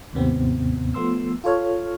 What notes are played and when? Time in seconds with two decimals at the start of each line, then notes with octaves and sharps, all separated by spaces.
0.13 D#2 G#2 C3 B3 C4
0.94 F3 A3 B3 C6 E6
1.44 F4 A4 C#5 F6